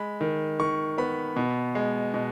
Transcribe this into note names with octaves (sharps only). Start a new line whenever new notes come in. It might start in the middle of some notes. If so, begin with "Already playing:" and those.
Already playing: G#3 B5
D#3
D#3 C#6
B3 B5
B2
G#3
B2